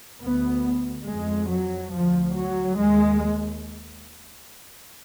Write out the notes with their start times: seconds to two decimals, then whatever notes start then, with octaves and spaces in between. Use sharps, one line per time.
0.21 D2 B3
1.07 F2 G#3
1.50 F#3
1.92 D2 F3
2.36 F#3
2.78 D#2 G#3